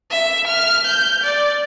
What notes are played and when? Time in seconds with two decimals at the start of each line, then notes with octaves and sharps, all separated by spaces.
0.10 E5
0.48 F6
0.87 G6
1.24 D5